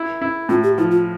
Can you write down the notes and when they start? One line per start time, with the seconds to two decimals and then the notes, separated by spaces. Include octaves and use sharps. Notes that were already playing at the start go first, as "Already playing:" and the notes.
Already playing: E4
0.22 E4
0.49 A2 F4
0.63 G4
0.78 F3 E4
0.91 F4